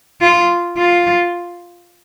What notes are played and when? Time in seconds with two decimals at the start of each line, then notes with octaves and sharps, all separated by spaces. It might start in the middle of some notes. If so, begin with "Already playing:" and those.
0.21 F4
0.77 F4